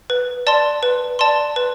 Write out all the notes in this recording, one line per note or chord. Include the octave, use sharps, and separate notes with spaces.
B4
D5 A5 C6
B4
D5 A5 C6
B4